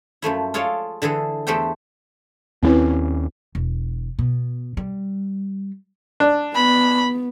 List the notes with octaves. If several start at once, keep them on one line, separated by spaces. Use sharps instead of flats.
F#2 F3 A3 E4
F4 G#4 A4 C#5 D5 F5
D3 E3 G#4 A4
E2 A3 G4 A4 C5 G5
D#2 A#3 C4 C#4 E4 B4
E1
B2
G3
D4
B3 B5